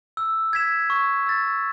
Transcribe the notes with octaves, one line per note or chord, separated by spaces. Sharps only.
E6
G#6 B6 E7
C#6
E6 A6